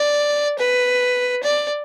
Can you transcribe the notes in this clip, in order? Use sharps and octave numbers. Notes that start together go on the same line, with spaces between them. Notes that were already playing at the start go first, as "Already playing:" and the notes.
Already playing: D5
B4
D5